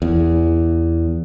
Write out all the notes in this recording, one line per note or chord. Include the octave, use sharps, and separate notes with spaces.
E2